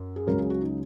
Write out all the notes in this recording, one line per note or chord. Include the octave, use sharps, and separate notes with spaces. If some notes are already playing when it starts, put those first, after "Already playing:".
Already playing: F#2
G#4
C#2 C#3 F#3 A#4
G#4
F#4
D#4